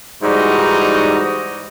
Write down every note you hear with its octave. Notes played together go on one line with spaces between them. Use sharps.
G#2 E3 G3 D#4 F#4